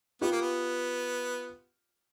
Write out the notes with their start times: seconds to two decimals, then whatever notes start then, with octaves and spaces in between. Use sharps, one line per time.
0.21 B3 F4 G4
0.32 A#3
0.41 B3